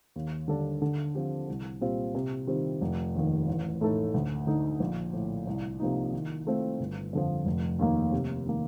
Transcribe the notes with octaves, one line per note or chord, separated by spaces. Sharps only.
D#2
D3 G3 D4 A4
D3
F3 C4 G4
C2
A#2 G3 C4 F4
C3
D#3 G3 C4 F4
F1
D#2 D#3
A1
A2 A3 D#4 A4
D2
D3 A3 D#4
A#1
A2 F3
C2
C3 F3 A#3 D#4
D#3
A3 C4 F4
G1
F2 D3 F3
F1
D#2 D#3 A#3
C3
D#3 A#3